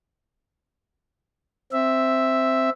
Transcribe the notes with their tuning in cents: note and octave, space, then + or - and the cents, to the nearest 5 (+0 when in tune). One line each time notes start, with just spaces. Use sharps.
C4 +0 E5 +0